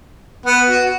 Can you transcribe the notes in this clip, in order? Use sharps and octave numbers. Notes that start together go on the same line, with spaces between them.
B3
F#4